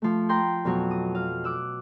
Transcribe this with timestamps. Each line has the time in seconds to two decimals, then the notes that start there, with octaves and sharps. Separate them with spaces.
0.02 F3 A3
0.29 G5 A#5 C6 G6
0.65 F2 B2 F#3
0.91 D#6
1.15 F5
1.44 D6 E6 F#6